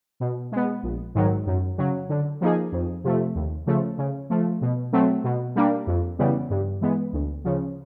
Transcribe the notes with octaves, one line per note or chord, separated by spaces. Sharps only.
B2
G#3 B3
A#1
G#2 D#3 F#3
F#2
C#3 F#3
D3
F3 A#3 D#4 G#4
F2
C3 F3 A3
D#2
C#3 F3 A3
C#3
F3 A3
B2
F#3 A3 C4
B2
G3 A#3 D4
F2
C#3 E3 G3 B3
G2
E3 G#3 B3
D2
C#3 F3